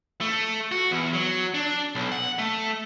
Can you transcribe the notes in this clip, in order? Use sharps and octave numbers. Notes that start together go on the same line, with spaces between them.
A3
F#4
E2
F#3
D4
B1
F#5
A3